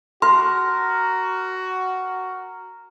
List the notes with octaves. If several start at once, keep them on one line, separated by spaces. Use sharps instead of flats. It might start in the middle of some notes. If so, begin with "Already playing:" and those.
F#4 A#4 C6